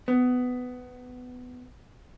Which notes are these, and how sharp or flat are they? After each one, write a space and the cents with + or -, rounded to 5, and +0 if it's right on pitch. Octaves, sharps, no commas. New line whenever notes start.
B3 +15